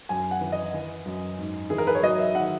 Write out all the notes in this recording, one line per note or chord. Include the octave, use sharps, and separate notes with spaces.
F#2 G#5
F#5
E3
D#5
E3
F#2
G#2
E3 G#4
A#4
B4
C#5
F#3 D#5
E5
D#3 F#5